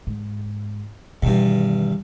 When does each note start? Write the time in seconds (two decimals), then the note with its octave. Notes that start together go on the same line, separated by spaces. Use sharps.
0.07 G#2
1.23 E2 G2 B2 D#3